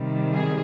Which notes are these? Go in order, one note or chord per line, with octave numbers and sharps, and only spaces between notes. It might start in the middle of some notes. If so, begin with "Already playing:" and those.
Already playing: C3 D#3 G3
G#4